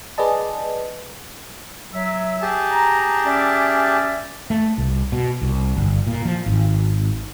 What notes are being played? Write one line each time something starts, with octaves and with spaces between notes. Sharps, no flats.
G#4 B4 D5 D#5 A5
F#3 E5
G4 G#4 A5
A#5
C#4 D5 E5
A3
C2
B2
C2
G1
A#2
F3
G#1